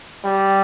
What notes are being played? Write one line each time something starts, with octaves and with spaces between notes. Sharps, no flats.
G3